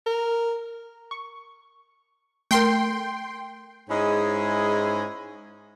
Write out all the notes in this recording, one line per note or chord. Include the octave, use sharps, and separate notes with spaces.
A#4
C#6
A3 A#4 G5 C6
G#2 G#3 C#4 E4 G#4 D#5